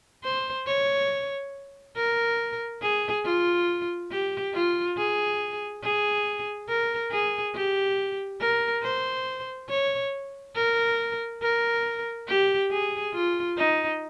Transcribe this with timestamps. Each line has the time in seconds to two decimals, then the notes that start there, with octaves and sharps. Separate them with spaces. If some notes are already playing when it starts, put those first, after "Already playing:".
0.24 C5
0.67 C#5
1.96 A#4
2.82 G#4
3.25 F4
4.11 G4
4.54 F4
4.97 G#4
5.83 G#4
6.69 A#4
7.12 G#4
7.55 G4
8.41 A#4
8.83 C5
9.70 C#5
10.56 A#4
11.42 A#4
12.28 G4
12.71 G#4
13.14 F4
13.57 D#4